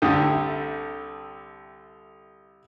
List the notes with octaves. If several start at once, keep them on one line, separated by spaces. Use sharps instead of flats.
C2 D3 A3 G4 D#6